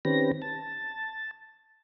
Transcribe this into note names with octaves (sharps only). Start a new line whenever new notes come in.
D#3 C4 C#4 G4 B4 A#6
A5